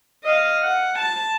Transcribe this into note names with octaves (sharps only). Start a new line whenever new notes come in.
D#5 F5
F#5
A5